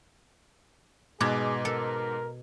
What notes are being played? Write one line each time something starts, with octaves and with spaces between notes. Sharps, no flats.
G#2 B2 G#4 D6 G#6
A4 A#4